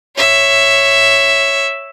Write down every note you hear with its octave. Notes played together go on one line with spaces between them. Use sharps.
C#5 E5